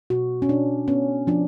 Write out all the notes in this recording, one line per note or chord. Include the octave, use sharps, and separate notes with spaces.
B2 F#4
C#4
B2 D4
B3 C#4
F3 D4